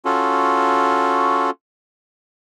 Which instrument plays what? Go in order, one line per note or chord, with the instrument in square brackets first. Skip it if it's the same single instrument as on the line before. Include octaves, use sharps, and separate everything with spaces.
[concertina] C#4 F4 F#4 A4